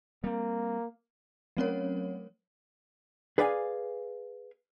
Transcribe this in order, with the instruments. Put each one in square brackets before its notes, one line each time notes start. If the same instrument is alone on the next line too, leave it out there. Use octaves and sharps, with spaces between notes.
[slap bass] G3 C4 [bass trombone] A#3
[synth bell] F#3 A3 C4 C#4 A#4 C#5
[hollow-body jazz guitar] G#4 B4 D5 F5 F#5 G#5